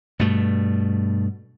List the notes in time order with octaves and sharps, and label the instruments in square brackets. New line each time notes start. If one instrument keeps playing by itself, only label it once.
[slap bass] G2 B2 A3